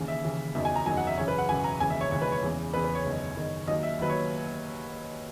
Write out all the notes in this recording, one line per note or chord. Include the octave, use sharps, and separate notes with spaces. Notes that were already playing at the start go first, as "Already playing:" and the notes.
Already playing: D#2 C#3 E3
E5
D#2 C#3 E3
F#1 E2 D#3 F#3 E5
G#5
A#5
F#1 E2 D#3 F#3 G#5
F#5
E5
F#1 F#2 C#3 E3 C#5
B4
F#5
F#1 F#2 C#3 E3 G#5
A#5
E1 D#2 C#3 E3 G#5
E5
C#5
E1 D#2 C#3 E3 C#5
B4
C#5
E2 C#3 E3
E2 C#3 E3 B4
B4
C#5
F#1 E2 D#3
F#1 E2 D#3
D#2 D#3 F#3 D#5
E5
D#2 D#3 F#3 B4
C#5